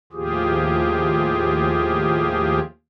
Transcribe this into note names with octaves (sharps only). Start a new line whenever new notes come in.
D#2 A2 F3 F4 G4 G#4